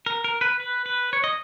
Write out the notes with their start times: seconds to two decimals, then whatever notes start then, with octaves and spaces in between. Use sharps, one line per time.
0.06 A#4
0.24 A#4
0.41 B4
0.60 B4
0.86 B4
1.13 C#5
1.24 D#5